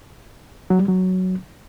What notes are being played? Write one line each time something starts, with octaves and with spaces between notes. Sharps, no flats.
F#3
G3
F#3